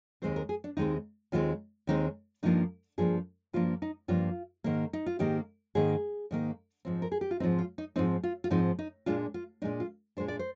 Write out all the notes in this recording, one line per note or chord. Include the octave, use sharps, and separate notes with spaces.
D#2 D#3 G#3 C4 C5
A#4
G#4
D4
D#2 D#3 G#3 C4 D#4
D#2 D#3 G#3 C4 F4
D#2 D#3 G#3 C4 D#4
G2 F3 A#3 D4 D#4
G2 F3 A#3 D4 G#4
G2 F3 A#3 D4 F4
D#4
G2 F3 A#3 D4 F4
G#2 D#3 A#3
D#4
F4
G#2 D#3 A#3 G4
G#2 D#3 A#3 G#4
G#2 D#3 A#3
G#2 F3 C4
A#4
G#4
G4
F4
G#2 F3 C4 D#4
F4
D#4
G#2 F3 C4 D#4
F4
F4
G#2 F3 C4 D#4
D#4
A#2 G#3 D4 F4
F4
A#2 G#3 D4 D#4
F4
A#2 G#3 D4 C5
D5
C5